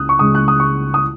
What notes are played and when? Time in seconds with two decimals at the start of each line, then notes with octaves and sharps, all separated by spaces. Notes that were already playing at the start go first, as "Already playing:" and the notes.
Already playing: C#2 C#3 D#6 F#6
0.09 C#6
0.19 C#2 C#3 G#3 D#6
0.35 F#6
0.48 D#6
0.60 C#6
0.94 D#6